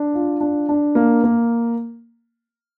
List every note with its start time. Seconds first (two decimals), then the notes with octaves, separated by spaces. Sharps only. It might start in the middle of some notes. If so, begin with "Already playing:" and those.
Already playing: D4
0.14 F4
0.41 D4
0.69 D4
0.95 A#3
1.24 A#3